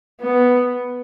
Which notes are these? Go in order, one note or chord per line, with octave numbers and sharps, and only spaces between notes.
B3